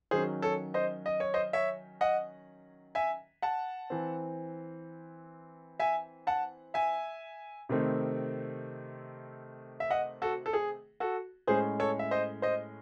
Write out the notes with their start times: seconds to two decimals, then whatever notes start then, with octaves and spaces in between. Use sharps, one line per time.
0.11 D#3 F#3 C#4 G#4 C5
0.42 A4 C#5
0.74 C5 D#5
1.06 D#5
1.20 C#5
1.34 C5 D#5
1.53 C#5 E5
2.01 D#5 F#5
2.95 E5 G#5
3.42 F#5 A5
3.90 E3 C4
5.79 E5 G#5
6.27 F#5 A5
6.74 E5 G#5
7.69 C3 D#3 A3 C4
9.80 E5
9.90 D#5 F#5
10.22 F#4 A4
10.46 A4
10.53 G#4
11.00 F#4 A4
11.47 A2 G#3 C#4 G#4 C5
11.80 A4 C#5
11.99 E5
12.11 C5 D#5
12.42 C5 D#5